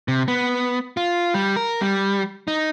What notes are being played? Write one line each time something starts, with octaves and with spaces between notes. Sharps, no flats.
C3
B3
F4
G3
A#4
G3
D#4